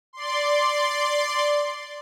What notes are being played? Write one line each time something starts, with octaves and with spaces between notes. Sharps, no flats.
D5 C6